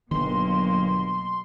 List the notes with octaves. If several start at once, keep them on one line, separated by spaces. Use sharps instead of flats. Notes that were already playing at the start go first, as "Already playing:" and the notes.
G1 B2 D#3 F#3 A#3 C6